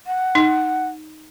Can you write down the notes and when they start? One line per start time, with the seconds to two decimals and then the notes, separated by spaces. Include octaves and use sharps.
0.06 F#5
0.35 D#4